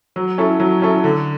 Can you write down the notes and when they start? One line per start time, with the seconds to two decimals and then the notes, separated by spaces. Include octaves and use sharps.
0.16 F#3
0.38 C#4 E4 A4
0.60 F#3
0.82 C#4 E4 A4
1.04 D3